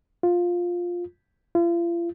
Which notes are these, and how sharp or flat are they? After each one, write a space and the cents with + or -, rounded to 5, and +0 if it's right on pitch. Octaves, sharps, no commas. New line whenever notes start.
F4 +10
F4 -40